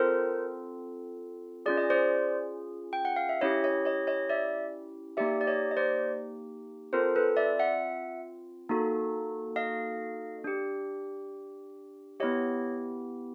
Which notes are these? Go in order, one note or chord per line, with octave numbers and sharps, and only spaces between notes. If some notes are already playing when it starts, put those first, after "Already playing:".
Already playing: C4 F4 A4 A#4 C5
C#4 F4 G#4 D5
D#5
C5 D5
G5
F#5
F5
E5
C#4 E4 G4 C#5 D#5
C#5 D#5
C#5 D#5
C#5 D#5
D5 E5
A#3 D#4 G4 D5 E5
D5
C#5 D#5
D#5
C5 D5
C4 F4 A4 A#4 C5
A4 B4
D5 E5
E5 F#5
A#3 D#4 F#4 A4
D#5 F5
D4 G4
B3 E4 G4 C#5 D#5